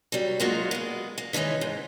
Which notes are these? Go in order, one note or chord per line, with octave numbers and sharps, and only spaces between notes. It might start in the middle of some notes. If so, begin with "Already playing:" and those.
F#3 G3
F#3 G#3 A#3 D#4 F4 F#4
G#3 B3
A#3
D#3 E3 G#3 C#4 D#4
G#2